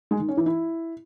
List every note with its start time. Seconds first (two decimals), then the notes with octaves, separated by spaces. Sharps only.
0.11 G#3
0.20 D#3
0.28 C#4
0.37 E3
0.46 E4